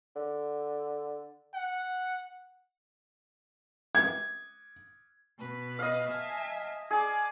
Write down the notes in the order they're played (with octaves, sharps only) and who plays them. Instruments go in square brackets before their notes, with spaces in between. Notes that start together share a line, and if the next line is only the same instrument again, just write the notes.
[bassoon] D3
[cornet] F#5
[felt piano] G#6
[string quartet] B2 B4
[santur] D#5 F5
[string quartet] E5 G#5 A5
[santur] G#4 [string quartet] D5 A5